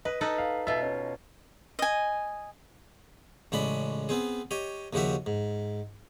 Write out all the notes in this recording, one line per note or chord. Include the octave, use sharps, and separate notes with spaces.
B4 D#5
D#4 A4 B4
F5
B2 F4 E5
C#4
D#5 G#5
A1 C#3 G#3 D4 B5
B3 C4 G#4
G4 C#5 D#5
D#2 C#3 F3 F#4 G4 E5
G#2